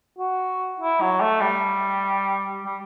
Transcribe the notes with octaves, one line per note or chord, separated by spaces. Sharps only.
F#4
E4
F#3
A3
G3
G3